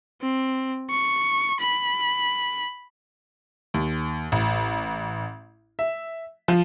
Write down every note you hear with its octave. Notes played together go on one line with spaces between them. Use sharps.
C4
C#6
B5
D#2
A1
E5
F3